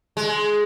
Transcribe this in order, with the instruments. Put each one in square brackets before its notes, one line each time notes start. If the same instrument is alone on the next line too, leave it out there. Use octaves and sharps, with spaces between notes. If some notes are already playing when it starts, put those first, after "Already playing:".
[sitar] G#3